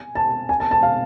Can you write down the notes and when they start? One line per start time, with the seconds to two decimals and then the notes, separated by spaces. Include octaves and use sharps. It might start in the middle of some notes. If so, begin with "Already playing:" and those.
Already playing: G#5
0.15 A5
0.49 G#5
0.60 A5
0.71 A5
0.83 F5